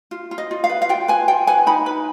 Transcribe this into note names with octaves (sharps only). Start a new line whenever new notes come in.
F4
F4
D#5
F4
F5
B4
F5
F4 G5
B4 G#5
F4 G5
B4 G#5
D#4 B5
B4